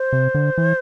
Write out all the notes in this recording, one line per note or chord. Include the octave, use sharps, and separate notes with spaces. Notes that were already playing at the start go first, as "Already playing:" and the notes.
Already playing: C5
C3
D3
E3